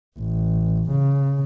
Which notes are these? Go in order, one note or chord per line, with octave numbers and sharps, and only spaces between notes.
A1
C#3